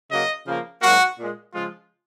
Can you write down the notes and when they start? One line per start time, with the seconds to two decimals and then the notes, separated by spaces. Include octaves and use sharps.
0.11 C#3 F#3 A#3 D#5
0.47 C#3 F3 A#3
0.82 G#2 F#3 A#3 F#4
1.18 A#2 G#3
1.53 C#3 F3 G#3 F4